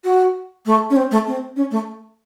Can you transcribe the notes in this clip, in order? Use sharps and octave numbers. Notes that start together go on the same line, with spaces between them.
F#4
A3
C#4
C4
A3
C4
C#4
A3